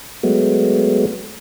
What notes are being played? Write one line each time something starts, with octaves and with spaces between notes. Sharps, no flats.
F#3 G#3 A3 B3